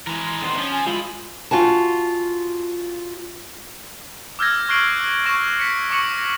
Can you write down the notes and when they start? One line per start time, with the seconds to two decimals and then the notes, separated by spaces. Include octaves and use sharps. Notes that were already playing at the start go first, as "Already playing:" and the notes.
0.07 E3 G#3 A#4
0.26 C6
0.42 D3 D#3 B3 C4 C5 C6
0.57 F3 C#4
0.72 G#5
0.86 F3 G#3 E4 F4 B5
1.51 F4 F#4 G#5 A5
4.39 D6 E6 F6 G6 G#6 A#6
4.69 C#6 F6 F#6 C7 D7 F#7
5.26 C#6 A#6 E7
5.59 B6 C#7
5.90 C#6 D6 C#7 F#7
6.18 A#6